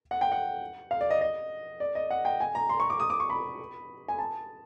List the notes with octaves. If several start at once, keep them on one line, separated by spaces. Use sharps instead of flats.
F#5
G5
F#5
F5
D5
D#5
D#5
D5
D#5
F#5
G5
G#5
A#5
C6
C#6
D6
D#6
D6
C#6
B5
G#5
A5